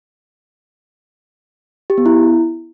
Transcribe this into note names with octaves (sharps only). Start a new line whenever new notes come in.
G4
B3
E4